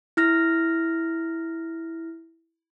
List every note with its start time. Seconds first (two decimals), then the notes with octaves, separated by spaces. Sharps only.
0.17 E4 F6 A#6